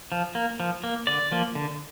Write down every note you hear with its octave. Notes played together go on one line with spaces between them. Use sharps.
F3
A#3
F3
A#3
D3 D5
F3 A#3
D3